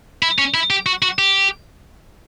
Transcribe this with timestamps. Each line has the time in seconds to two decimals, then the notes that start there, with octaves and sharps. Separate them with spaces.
0.23 E4
0.39 C#4
0.54 E4
0.70 G4
0.86 F#4
1.02 F#4
1.19 G4